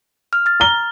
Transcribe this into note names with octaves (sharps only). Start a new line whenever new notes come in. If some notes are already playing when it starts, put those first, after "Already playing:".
F6
F6 A6
A#5 G7